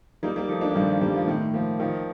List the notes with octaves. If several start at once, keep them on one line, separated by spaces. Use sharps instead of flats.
G3 A#3 D#4
G3 A#3
F3 A3 D#4
A#3 D4
F3
G2 D#3 G3
F3
G2 G3 A#3
F3
A2 D#3
F3 A#3
D#3 F3